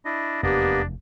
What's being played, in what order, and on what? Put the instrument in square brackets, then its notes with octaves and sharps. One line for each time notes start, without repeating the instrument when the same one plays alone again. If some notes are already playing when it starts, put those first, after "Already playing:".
[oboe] D4 [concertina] E4 D#5
[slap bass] F1 E2 [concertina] A#3 B3 D#5 [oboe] D4 [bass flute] G4